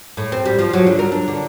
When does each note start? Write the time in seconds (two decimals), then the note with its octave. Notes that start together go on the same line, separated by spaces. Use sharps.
0.17 A2
0.32 C4
0.45 G3
0.59 F3
0.73 F#3
0.87 D3
0.99 A#4
1.12 D4
1.28 D3